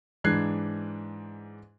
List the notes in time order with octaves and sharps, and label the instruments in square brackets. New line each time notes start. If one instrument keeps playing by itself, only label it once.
[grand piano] G#2 E3 D4 F#6 G#6 C7